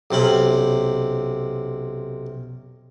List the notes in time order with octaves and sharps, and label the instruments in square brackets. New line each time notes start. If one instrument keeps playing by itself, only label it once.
[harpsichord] B1 C3 C#4 B5